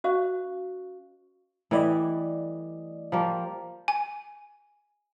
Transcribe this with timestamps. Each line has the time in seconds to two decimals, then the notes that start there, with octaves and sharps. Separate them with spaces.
0.04 C#4 F#4 C5 D#5 F5 C#6
1.71 E3 G3 A3 E4 D5 D#5
3.12 F3 G3 A#3
3.88 G#5